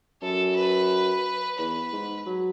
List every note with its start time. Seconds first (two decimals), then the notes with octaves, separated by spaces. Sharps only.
0.22 F#2 A4
0.56 B4
1.58 E2 B4
1.93 G#2
2.26 F#3